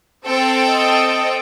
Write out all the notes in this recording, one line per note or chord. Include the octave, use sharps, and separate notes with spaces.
C4 A4 G5
D#5